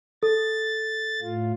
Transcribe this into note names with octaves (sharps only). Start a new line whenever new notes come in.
A4 A6
A2 F4